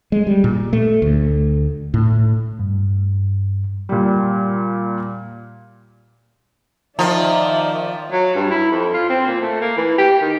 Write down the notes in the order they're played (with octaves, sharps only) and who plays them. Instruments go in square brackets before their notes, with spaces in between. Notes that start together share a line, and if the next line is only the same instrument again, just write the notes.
[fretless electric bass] G#3
G3
A#2
A3
D2
A2
[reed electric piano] G2
[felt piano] A#2 G3
[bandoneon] D#3 [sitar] F3 [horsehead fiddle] D5 E5 [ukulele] A#5
[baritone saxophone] F#3
G2
E4
F2
F4
C4
A#2
A3
A#3
E3
G4
D#3